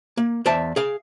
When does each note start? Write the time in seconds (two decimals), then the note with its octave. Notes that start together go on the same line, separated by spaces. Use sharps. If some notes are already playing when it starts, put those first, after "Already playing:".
0.17 A#3
0.46 E2 C5 D5 E5 A5
0.76 G#4 F5